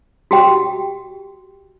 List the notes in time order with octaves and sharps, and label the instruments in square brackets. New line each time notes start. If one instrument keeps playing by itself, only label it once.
[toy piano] F#4 G4 G5